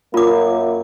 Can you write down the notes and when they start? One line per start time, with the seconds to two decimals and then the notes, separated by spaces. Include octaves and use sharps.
0.14 F#2 A#3 F4 D6